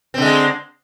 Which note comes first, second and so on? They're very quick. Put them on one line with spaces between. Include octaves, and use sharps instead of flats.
C4 D3 G#3